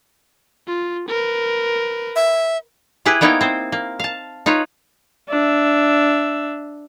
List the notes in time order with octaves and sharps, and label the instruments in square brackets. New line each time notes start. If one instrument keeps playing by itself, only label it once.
[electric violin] F4
A#4 B4
[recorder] E5
[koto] E4 G4 G#4 B4
A#3 B3 D#4 E4 C#5 G5
C4 C5
A#3
F5 A5
D#4 F4 B4 C#5
[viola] D4 E5